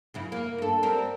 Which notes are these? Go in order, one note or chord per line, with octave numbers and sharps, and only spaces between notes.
F#2 C#3 E4
A#3
G2 A4
G3 C4 A#4